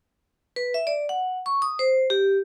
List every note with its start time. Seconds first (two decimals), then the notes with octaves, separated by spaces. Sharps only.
0.56 B4
0.74 E5
0.87 D5
1.09 F#5
1.46 C#6
1.62 D#6
1.79 C5
2.10 G4